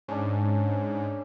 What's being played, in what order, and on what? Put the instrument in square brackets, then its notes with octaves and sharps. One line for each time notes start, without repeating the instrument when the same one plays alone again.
[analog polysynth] G#2 [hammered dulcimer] C#4 D4